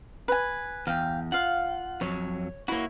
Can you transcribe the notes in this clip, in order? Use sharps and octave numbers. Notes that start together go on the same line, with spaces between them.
B4 G#5
E2 F5 G5
F4 F5 F#5
F2 F#3 C#5
A#3 E4 F#4 C#5